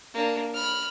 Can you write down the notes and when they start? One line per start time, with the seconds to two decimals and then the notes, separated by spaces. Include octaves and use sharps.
0.14 A#3 D4
0.54 B5 F6